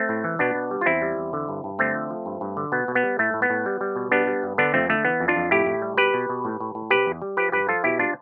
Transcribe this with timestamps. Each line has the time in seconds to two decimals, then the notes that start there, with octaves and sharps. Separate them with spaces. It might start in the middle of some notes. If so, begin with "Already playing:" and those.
Already playing: A3 C4
0.09 A2
0.24 E3
0.39 B2 B3 D4
0.55 B2
0.71 G3
0.81 F4
0.86 E2 C4 E4
1.02 G3
1.17 E2
1.33 D3
1.49 G2
1.64 G2
1.79 D3 A3 C4
1.94 F3
2.10 F3
2.26 G2
2.41 G2
2.57 D3
2.72 B2 B3
2.88 B2
2.95 B3
3.03 G3
3.19 A2 A3
3.34 A2
3.42 B3
3.50 A2
3.66 G3
3.81 G3
3.96 B2
4.11 G3 B3 D4
4.27 G3
4.43 G2
4.58 D3 B3 D4
4.74 F2 A3 C4
4.89 D3 A3
5.05 E3 B3
5.20 F2
5.28 D4 F4
5.36 F2
5.51 A2 E4 G4
5.66 A2
5.82 G3
5.98 B2 G4 B4
6.14 B2
6.29 B2
6.45 A2
6.60 A2
6.75 A2
6.90 C3 G4 B4
7.06 E2
7.22 G3
7.37 F3 G4 B4
7.52 G2 G4 B4
7.68 F3 F4 A4
7.84 B2 E4 G4
7.99 G3 D4 F4